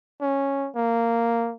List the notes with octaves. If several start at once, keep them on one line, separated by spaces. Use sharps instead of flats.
C#4
A#3